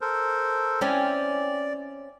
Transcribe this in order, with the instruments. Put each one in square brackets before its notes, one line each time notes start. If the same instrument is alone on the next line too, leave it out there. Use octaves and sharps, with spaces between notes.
[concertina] A4 A#4 C5
[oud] C4 C#4 E4 [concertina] D5